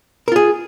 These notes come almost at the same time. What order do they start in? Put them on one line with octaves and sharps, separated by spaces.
A#4 F4 G#4